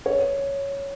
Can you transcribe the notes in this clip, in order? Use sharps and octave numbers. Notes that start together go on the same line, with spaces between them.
C#5